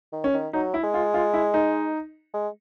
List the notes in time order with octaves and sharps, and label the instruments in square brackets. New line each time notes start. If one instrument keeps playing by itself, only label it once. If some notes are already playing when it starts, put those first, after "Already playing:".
[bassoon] D#3
[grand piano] C#4
[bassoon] D#3
[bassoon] F#3 [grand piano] D#4
[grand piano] E4
[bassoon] G#3
[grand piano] F4
F4
E4
D#4
[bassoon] G#3